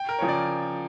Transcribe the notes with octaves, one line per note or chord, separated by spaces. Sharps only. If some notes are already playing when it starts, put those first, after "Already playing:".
Already playing: G5
A#4
C#3 F3 C#5
D5